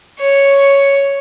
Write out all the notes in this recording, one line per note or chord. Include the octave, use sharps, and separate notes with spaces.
C#5